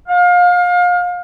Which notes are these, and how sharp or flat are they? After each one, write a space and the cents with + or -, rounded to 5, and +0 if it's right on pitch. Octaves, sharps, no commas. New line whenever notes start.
F5 +30